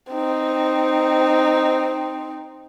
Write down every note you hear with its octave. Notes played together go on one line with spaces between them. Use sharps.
C4 D#4